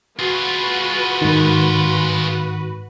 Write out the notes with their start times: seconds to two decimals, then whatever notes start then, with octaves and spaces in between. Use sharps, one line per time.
0.19 F4 F#4 G#4 B4
1.21 G#2 D#3